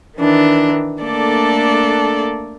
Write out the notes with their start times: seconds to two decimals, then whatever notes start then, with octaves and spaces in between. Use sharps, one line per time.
0.18 D#3 E3 D4
1.01 A3 A#3 D4 A4 D5